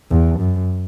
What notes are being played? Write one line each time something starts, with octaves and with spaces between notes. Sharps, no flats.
E2
F#2